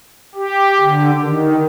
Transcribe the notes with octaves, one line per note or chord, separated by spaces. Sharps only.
G4
D3
D#3